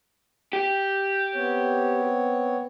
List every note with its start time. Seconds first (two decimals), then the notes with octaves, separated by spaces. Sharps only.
0.53 G4
1.34 B3 C4 C#5